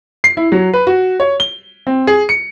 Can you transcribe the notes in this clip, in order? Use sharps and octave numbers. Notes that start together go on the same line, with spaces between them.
C7
E4
F#3
B4
F#4
C#5
G7
C4
G#4
C#7